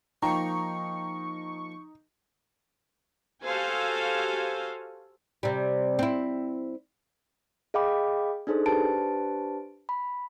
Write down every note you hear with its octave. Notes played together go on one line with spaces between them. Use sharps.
F3 A#3 D#4 G5 A#5 C#6
F#4 G4 A4 C5 F5 G#5
C3 G3
C4 E4
G#4 D#5 F5 G5 B5 D6
D4 D#4 G#4 A4 C5
D4 G4 B4 C5 A5 D7
B5